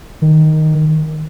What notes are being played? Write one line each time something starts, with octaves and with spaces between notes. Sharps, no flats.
D#3